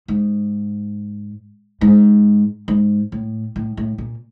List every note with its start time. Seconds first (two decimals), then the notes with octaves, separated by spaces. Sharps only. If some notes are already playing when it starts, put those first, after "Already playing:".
0.08 G#2
1.81 G#2
2.68 G#2
3.12 A2
3.56 A2
3.77 A2
3.98 A#2